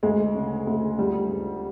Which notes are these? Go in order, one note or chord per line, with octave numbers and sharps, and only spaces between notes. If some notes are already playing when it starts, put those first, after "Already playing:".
D2 G#3
C#3
D2
C#2 G3
C#2